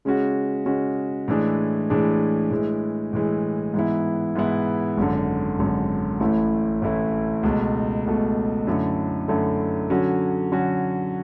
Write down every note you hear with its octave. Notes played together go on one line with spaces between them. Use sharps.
C#3 G#3 C#4 F#4
C#3 G#3 C#4 F#4
A2 E3 G#3 D4 G#4
A2 E3 G#3 D4 G#4
A2 E3 G#3
A2 E3 G#3
G#2 E3 B3 E4
G#2 E3 B3 E4
G#1 F#2 D3
G#1 F#2 D3
A1 A2 E3 A3 E4
A1 A2 E3 A3 E4
C#2 B2 A3
C#2 B2 A3
F#2 D3 A3 E4
F#2 D3 A3 E4
D3 F#3 C#4 F#4
D3 F#3 C#4 F#4